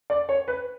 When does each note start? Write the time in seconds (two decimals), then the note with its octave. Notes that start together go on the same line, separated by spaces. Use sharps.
0.10 D5
0.29 C#5
0.48 B4